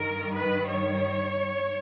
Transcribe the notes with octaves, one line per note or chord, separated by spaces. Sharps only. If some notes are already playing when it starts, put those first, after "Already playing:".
Already playing: G2 D#3 G3 A#4
B4
C#5